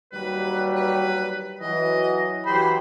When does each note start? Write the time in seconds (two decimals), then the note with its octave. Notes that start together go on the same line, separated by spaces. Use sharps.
0.12 D#2 F#3 G3 B4
0.75 B4
1.61 E3 F#3 D#5
2.46 E3 F#3 G4 C5 B5